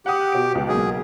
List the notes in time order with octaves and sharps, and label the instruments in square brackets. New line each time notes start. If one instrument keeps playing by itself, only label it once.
[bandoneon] G4 [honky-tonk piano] F#5 D#6
[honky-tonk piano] B2 D7
C#2
[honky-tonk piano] B1 A#3 [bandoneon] G#4